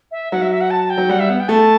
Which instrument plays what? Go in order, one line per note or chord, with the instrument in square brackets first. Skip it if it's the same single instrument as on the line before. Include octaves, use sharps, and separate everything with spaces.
[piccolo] E5
[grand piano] F#3 [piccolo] F#5
[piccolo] E5
E5
F#5
A5
G5
[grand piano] F#3
[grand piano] G3 [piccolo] F#5
[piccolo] E5
[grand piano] B3 [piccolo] F#5
[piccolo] G5
[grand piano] A3 [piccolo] A5